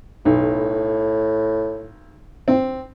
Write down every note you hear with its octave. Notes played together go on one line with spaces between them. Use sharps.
B1 A2
C4